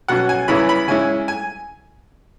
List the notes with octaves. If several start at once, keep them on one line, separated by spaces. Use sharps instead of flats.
B2 F#3 C#4 F#5
G#5
E2 C#3 E3 C#4 E4 B5
B5
C#3 G#3 C#4 E4 G#5
G#5